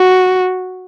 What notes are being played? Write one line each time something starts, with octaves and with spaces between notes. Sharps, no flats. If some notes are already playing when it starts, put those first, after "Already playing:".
Already playing: F#4